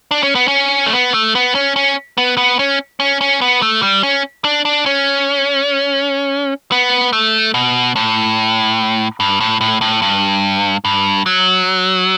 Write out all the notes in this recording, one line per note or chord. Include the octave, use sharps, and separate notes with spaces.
D4
C#4
B3
C#4
A3
B3
A3
B3
C#4
C#4
B3
B3
C#4
C#4
C#4
B3
A3
G3
C#4
D4
D4
C#4
B3
A3
B2
A2
G2
A2
A2
A2
G2
G2
F#3